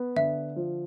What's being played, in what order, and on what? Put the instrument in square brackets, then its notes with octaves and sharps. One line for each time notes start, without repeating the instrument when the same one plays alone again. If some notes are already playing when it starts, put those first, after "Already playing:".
Already playing: [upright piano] B3
[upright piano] D3 [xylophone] E5
[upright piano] F3